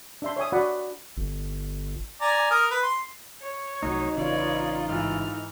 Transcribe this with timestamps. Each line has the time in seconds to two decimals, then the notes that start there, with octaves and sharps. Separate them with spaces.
0.22 D4 E5 C6
0.37 C#5 E5 G#5 D#6
0.52 D4 F#4 D5 F#5 B5
1.17 G1
2.21 D5 G#5 A#5
2.51 A#4 D#6 F6
2.71 B4
2.83 C6
3.42 C#5
3.83 C2 F#3 A3 D#4
4.16 A1 C#3 D4 F4 B4 C#5 D5
4.87 G#2 E3 F6